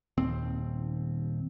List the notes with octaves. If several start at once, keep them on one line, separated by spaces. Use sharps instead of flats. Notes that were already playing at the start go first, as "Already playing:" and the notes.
D#1 D#2 C4